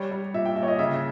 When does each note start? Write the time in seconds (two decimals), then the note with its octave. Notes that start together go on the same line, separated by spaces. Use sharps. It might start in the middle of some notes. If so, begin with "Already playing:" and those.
Already playing: G3 C#5
0.12 G3
0.34 A#2 E5
0.45 G5
0.56 A#2 E5
0.63 C#5
0.68 D#5
0.79 C#3 E5